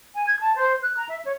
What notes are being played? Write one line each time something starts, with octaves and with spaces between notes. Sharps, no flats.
G#5
G#6
A5
C5
F#6
A#5
E5
C#5